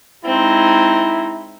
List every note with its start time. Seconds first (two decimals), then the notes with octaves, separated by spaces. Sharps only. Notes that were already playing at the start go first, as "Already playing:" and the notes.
0.25 G#3 C4 D#4 E4